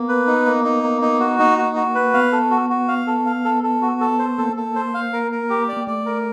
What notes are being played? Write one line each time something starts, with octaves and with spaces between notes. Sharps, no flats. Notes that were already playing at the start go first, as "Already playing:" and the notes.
Already playing: A#3 B3
B4
D#4
A#3
D#4
A#3
D#4
F#4
A#3 D#4
F#4
F#4
B4
B3 F5
A4
F#4
F#4
F5
A4
F5
A4
A4
F#4
A4
C5
A#3 A4
A4
C5
F5
A#4
A#4
G4
D5
A#3
A3 D5
A#4